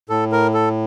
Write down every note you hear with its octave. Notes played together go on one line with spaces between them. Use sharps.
A2 A4
A#4
A4